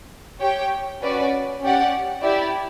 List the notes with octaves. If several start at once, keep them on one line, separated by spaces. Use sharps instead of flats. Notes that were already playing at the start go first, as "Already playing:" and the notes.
G4 C#5 G5
C#4 F#4 B4 D5
C#4 G4 D5 F#5
E4 G4 D5